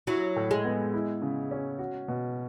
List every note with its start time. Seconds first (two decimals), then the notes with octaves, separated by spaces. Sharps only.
0.07 F#3 E4
0.36 A2
0.51 G#3
0.64 B3
0.94 E4
1.22 C#3
1.51 C#4
1.79 F#4
2.08 B2